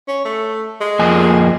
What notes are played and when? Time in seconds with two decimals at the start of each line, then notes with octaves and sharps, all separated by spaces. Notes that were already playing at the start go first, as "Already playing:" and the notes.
0.08 C#4
0.25 A3
0.81 G#3
0.99 F2 A#3 G#5